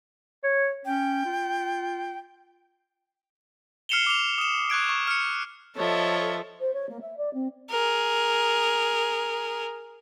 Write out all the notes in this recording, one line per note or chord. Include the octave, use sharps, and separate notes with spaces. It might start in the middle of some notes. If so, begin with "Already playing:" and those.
C#5
C#4 G5
F4
F6 C7 C#7 E7 F7 G7
D6 F7
D#6 E7
C#6 F#6 G#6 D7
C#6
F6 C#7
F3 A4 C#5 D#5 E5
C5
C#5
A#3
E5
D5
C4
G#4 A#4